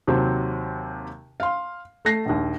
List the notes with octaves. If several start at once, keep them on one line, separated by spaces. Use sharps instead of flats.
D#2 C3 F#3 C4
F5 C6
A3 A#6 C7
A#1 D#2